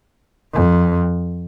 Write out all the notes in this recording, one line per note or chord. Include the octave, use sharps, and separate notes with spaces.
F2